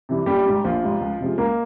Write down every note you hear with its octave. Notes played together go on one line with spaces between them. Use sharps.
C3 E3 G3
A#1 G3 G4
G#2 G3
A#1 F3 F4
G#2 G3
C#2
C3 F3 G#3
C#2 A#3